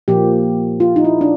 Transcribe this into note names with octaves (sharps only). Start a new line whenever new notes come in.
A#2 F3 A#3 G4
F4
D#4
E4
D4